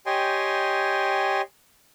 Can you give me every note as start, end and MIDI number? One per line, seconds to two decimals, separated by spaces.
0.06 1.41 67
0.06 1.41 73
0.06 1.41 75
0.06 1.41 79
0.06 1.41 80
0.06 1.41 84